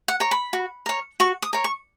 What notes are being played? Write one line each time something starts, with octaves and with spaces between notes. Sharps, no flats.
F#5
A#4 C#5
B5
F#4
A#4 C#5
F#4 C#6
D#6
A#4 C#5
C#6